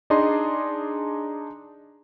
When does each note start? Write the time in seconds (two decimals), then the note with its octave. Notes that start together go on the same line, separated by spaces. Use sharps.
0.10 D4 D#4 G#4 D5 D#5 C6